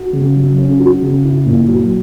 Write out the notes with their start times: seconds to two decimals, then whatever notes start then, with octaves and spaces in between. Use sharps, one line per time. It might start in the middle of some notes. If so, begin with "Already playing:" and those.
Already playing: F#4
0.13 C#3
0.35 F#3
0.58 C#4
0.80 F#4
1.02 C#3
1.24 E4
1.46 A#2
1.68 F#3